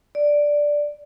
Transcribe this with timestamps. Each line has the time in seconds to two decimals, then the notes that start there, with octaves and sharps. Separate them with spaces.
0.15 D5